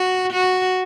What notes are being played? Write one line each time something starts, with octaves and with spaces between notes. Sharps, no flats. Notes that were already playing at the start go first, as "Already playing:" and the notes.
Already playing: F#4
F#4